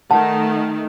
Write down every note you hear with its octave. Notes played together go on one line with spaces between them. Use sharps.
D#3 A3 F#5 A5